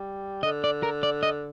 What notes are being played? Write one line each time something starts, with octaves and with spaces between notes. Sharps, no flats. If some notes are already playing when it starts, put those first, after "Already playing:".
Already playing: G3
D3 D#5
D5
A#4
D5
D#5